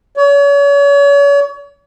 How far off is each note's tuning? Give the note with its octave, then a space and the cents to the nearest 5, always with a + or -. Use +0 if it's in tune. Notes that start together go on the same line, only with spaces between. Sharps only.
C#5 +40